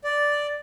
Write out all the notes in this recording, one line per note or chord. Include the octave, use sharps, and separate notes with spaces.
D5